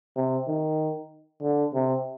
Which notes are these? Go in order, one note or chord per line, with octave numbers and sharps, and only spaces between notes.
C3
D#3
D3
C3